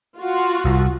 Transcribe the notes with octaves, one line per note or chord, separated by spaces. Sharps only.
F4 F#4
C2